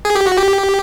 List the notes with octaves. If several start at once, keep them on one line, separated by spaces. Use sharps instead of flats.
G#4
G4
F#4
G4